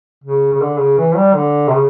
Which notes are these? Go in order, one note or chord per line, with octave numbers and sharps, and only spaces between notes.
C#3
C#3
D3
C#3
E3
G3
D3
C3
C#3